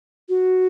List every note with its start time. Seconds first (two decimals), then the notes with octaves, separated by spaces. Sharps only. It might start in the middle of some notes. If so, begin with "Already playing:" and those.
0.29 F#4